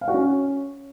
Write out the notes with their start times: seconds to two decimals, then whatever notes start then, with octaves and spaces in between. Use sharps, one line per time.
0.01 F5
0.08 F#4
0.14 C#4